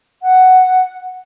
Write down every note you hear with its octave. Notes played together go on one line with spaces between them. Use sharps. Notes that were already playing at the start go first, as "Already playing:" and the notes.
F#5